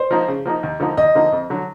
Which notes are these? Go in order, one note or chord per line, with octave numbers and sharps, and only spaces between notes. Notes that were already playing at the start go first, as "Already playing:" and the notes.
Already playing: C5
F3 A#3 D#4
C#3
F3 A#3 D#4
D#2
D3 F3 A#3 D#4
D#2 D#5
D3 F3 A#3 D#4
F2
D3 F#3